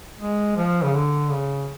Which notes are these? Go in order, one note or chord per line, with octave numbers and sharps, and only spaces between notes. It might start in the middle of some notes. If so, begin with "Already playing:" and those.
G#3
F3
C#3
D3
C#3